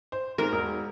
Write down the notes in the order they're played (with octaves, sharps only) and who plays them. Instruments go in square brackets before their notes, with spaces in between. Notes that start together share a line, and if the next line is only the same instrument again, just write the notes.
[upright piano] C5
[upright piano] G#2 [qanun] A#4
[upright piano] E1